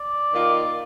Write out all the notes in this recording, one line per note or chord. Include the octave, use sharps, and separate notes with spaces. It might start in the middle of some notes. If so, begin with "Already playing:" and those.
Already playing: D5
D#3 A#3 F4